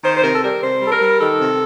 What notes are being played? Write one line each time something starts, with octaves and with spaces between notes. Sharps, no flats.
D#3 C5
C5
C3 A#4
A4
G3 A#4
C3 C5
G3 A4
A#4
G3
D#3 A4
C3